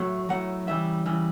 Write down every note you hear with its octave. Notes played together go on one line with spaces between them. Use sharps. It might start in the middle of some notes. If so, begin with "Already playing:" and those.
Already playing: A2 F#3 A3
A2 F#3 A3 F#5
C#3 E3 G3 E5
C#3 E3 G3